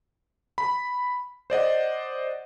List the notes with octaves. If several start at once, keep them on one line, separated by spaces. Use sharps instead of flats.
B5
C5 D5 D#5 F#5